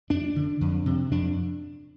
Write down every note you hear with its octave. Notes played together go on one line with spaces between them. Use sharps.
F2 D4
D3
F2
C3
F2 D4